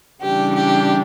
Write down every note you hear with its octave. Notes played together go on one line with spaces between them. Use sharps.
C#3 E3 G3 D4 G4
G4